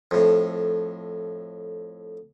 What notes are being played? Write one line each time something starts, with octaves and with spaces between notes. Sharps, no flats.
F2 A2